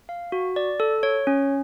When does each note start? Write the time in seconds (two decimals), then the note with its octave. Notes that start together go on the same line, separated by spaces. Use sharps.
0.09 F5
0.32 F#4
0.56 D5
0.80 A4
1.03 C#5
1.27 C#4